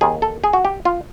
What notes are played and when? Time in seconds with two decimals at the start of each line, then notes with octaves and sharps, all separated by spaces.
0.01 D#2 D#3 G#4
0.22 A4
0.44 G#4
0.53 F#4
0.65 G4
0.85 F4